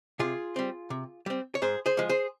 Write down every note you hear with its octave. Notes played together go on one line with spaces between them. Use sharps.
C3 F4 G#4
G3 C4
C3
G3 C4
C#5
G#2 G#4 C5
G#4 C5
F3 G#3
G#4 C5